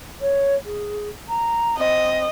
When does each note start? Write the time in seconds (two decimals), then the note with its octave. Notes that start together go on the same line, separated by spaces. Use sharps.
0.21 C#5
0.65 G#4
1.29 A#5
1.79 C4 D#5